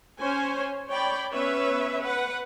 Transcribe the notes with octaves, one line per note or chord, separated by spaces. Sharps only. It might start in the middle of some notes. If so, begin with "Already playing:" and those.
C#4 C5 C#5 G#5
C#5 D5 G5 B5
B3 C#4 B4 C#5 E5
B4 F#5